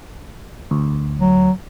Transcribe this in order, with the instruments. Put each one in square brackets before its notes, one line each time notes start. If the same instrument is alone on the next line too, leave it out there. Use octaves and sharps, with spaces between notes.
[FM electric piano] D2
[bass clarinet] F#3